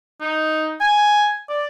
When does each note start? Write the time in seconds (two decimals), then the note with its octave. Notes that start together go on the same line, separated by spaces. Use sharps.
0.21 D#4
0.81 G#5
1.49 D5